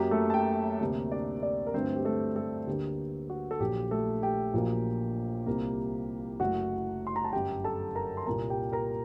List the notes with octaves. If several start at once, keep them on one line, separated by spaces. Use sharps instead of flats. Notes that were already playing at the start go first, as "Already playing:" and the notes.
Already playing: F#2 F#3 A#3 G4
A3 A4
A5
G4 G5
D2 C3 G3 A#3
D4 D5
D4 D5
A#4
G2 D3 F#3 A3 C4 C5
G4
A3 A4
A3 A4
D2 D3 G3 A#3 G4
F#4
A4
A#1 A#2 F#3 G4
A3 A4
G4 G5
A#1 A#2 F#3 A#3
C2 C3 G3 A#3
F#1 F#2 F#3 A3 F#4 F#5
C6
A#5
A5
G1 F#2 F#3 G4 G5
A4 A5
A#4 A#5
C6
C2 A#2 G3 A#3 A#4 A#5
G4 G5
A#4 A#5